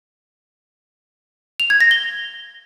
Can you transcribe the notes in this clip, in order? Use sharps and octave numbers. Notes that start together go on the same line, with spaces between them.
F7
G#6
A#6
G7